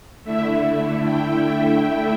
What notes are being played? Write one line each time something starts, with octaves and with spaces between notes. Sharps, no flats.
D3 A3 E4 E5
G5